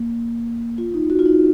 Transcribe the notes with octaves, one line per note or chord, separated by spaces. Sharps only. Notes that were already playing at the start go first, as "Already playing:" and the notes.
Already playing: A#3
F4
D#4
F#4
F4
D#4